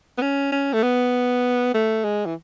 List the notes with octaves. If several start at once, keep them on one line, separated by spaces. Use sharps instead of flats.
B3
C#4
C#4
A3
B3
A3
G#3
E3